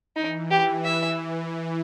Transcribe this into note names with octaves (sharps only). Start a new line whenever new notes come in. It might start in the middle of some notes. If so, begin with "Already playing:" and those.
E3 D#4
G4
E5